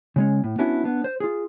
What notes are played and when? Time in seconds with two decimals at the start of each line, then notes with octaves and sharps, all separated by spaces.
0.16 C#3 G#3 C#4
0.44 A2
0.58 B3 C#4 D4 E4 F#4
0.84 B3 D4
1.04 C5
1.20 F4 G#4